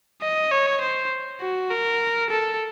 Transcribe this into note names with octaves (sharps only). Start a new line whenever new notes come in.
D#5
C#5
C5
F#4
A#4
A4